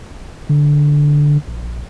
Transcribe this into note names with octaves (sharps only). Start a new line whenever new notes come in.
D3
A#1